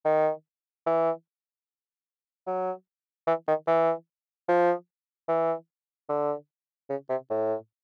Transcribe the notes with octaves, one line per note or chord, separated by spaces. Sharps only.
D#3
E3
F#3
E3
D#3
E3
F3
E3
D3
C#3
C3
A2